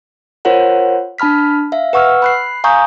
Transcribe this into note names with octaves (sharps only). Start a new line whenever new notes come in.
F4 A#4 C5 C#5 F#5
D4 A5 B5 F6 B6
E5 F5
B4 F#5 C#6 E6 F6
B5 F#6 C7
F5 G#5 A#5 C#6 D#6 G6